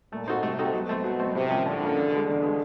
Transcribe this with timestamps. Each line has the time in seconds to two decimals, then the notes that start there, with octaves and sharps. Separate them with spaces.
0.12 A#2 A3
0.27 C4 D#4 F#4 A4
0.43 C3 A3
0.59 C4 D#4 F#4 A4
0.73 B2 F#3
0.89 A3 C4
1.04 F#3
1.20 A3 C4
1.35 A2 C3
1.50 F3 A#3 C#4
1.66 A2 D3
1.81 F3 A#3 C#4
1.96 E2
2.11 B2 G#3
2.27 E2 D3
2.42 B2 G#3